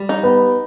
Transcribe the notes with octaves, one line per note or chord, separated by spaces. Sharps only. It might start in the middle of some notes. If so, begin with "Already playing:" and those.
Already playing: G3
D#4
B3